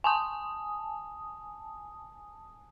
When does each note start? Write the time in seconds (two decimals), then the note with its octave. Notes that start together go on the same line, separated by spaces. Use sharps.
0.04 G#5 A5 D#6